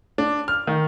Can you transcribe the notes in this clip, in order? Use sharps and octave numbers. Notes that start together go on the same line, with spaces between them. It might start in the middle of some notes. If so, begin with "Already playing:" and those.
D4
F6
D#3